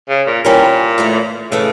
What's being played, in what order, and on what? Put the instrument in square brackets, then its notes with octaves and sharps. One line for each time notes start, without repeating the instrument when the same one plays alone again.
[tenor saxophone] C#3
A#2
[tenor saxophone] A#2 [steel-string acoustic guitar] E3 G3 C#4 G4 A#4
[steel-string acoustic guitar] A2 E3 A3
[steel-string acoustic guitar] A2 E3 A3 [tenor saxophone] C#3